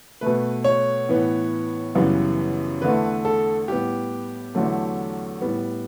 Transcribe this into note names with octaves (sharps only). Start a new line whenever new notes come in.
B2 A3 B4
C#5
A2 E3 B3
F#2 C#3 E3 G3 B3
E2 D3 A3 B4
A4
A2 G3 B3 G4
E2 D3 F#3 A3
A2 G3 B3